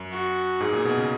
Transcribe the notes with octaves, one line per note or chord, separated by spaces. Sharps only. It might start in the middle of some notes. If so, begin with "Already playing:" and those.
Already playing: F#2
F#4
G#2 G#4
A#2
B2
C#3